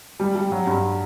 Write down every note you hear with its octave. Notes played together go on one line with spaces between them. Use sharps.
G3
G3
F#3
G2